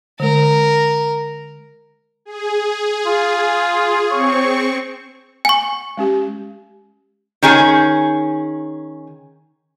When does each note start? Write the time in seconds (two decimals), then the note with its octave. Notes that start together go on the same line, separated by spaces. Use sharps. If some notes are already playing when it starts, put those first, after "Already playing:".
0.20 D3 G#3 A#4
2.25 G#4
3.07 F4
4.11 C4 C#5 C#6
5.45 F#5 G#5 C#6
5.97 G#3 C#4 G4
7.42 D#3 C#4 G#4